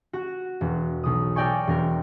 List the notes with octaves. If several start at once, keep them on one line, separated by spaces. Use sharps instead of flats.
F#4
E1
B1 D#6
A4 A#4 D5 G5 G#5 C#6
E1 A#4